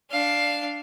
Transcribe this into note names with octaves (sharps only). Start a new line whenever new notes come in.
D4 F5